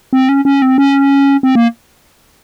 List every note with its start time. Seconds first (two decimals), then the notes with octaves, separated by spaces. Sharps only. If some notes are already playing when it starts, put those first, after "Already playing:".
0.13 C4
0.29 C#4
0.45 C#4
0.62 C4
0.78 C#4
1.43 C4
1.55 A#3